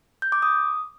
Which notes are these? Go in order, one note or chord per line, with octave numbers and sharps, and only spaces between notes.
G6
D6
D#6